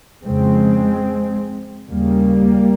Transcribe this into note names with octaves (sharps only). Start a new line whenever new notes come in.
F2 C#3 G#3 C4
D#2 C#3 G3 A#3